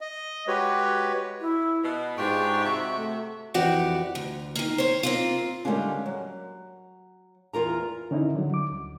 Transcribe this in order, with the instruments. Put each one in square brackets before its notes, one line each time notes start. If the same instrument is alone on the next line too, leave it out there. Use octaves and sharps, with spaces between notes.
[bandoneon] D#5
G#3 F#4 G4 B4 C#5
[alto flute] E4
[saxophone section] B2
[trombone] G#2 [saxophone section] D4 F4 G4 [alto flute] C#6
[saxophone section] C3 F#4 E5
[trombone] A3
[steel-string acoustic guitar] F2 E3 F#4 G4 D5 F#5
D2
D#3 A#3
C5 C#5
A#3 C4 F4
D3 G3 G#3 A#3 C#4 D4
F#3
E2 F4 A#4 A#5
[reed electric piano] D3 C#4 D#4 E4
D3 F#3
D6
D2